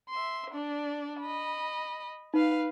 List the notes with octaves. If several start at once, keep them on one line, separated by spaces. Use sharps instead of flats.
E5 C6
D4 D5
D#5 B5
D#4 B4 F5